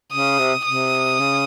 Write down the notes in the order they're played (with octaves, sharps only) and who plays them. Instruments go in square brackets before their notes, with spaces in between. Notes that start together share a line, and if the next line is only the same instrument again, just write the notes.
[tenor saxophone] C#3 [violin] D#6
[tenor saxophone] C3
[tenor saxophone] C3 [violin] D#6
[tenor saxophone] C#3